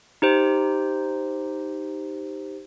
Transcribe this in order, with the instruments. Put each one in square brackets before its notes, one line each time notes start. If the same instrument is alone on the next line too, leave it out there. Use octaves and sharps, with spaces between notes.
[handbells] D#4 G4 C5